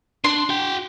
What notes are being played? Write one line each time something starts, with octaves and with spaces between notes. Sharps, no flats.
D4 C6
F#4 G5